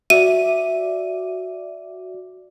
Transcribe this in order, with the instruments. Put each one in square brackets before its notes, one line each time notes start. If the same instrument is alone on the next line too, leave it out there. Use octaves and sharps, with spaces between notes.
[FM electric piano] F#4 D5 [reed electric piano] E5 [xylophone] D#7